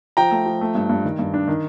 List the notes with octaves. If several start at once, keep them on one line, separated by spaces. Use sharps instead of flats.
F3 G5 A#5
A3
F3
A3
G2
G2
D#3
G2
D4
D#3